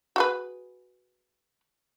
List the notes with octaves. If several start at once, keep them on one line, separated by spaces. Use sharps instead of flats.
F#4 G#4 B4